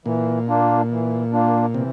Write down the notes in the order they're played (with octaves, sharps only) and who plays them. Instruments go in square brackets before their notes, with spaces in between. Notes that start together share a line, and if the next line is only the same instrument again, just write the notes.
[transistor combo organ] A#2 [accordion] E3
[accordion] A#3 D4 F4
E3
A#3 D4 F4
[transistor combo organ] C3 [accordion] E3